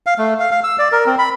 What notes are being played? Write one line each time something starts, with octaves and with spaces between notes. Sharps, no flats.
F5
A3
F5
F5
E6
D5
A#4
C4
B5